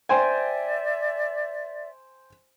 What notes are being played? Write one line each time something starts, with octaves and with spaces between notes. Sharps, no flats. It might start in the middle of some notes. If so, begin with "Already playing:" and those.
C5 D5 E5 G5 G#5